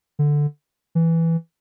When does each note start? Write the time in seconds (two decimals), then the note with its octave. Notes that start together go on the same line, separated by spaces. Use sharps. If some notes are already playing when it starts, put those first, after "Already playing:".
0.19 D3
0.95 E3